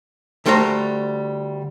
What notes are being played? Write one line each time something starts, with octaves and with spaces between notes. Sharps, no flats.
D2 G3 A3 C5 E5 A#5